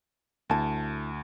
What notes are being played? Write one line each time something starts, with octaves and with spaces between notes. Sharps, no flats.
D2 E4 A5